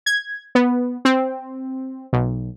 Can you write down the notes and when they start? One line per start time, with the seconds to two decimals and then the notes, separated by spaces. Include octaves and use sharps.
0.06 G#6
0.55 B3
1.05 C4
2.13 B1